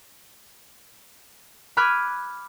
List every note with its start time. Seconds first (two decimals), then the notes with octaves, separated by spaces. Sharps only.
1.77 B5 D6 F6 F#6 G#6 D#7